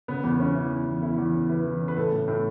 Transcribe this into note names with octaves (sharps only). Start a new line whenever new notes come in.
C#3 B3
E2 B3
E3 C#4
E3
E2
E2
E3 E4
E2
C#3
E3 B4
E3
C#3
B4
A2 A4
A2
A2